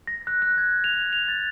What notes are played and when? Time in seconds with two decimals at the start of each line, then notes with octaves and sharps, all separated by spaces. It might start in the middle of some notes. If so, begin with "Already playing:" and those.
0.07 A#6
0.27 F#6
0.42 F#6
0.58 G#6
0.84 F7
1.13 F7
1.28 A6